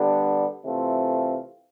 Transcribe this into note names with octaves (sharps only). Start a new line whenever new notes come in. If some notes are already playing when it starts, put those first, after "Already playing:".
Already playing: D3 G3 B3 D4
C3 E3 A3 C4 F4